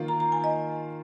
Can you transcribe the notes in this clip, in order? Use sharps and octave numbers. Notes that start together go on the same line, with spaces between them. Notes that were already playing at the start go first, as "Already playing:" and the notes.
Already playing: D#3 A#3 F4
A#5
A#5
G#5
D#5